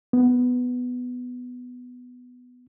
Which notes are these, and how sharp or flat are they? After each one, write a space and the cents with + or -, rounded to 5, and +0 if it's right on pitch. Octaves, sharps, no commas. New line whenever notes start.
B3 +5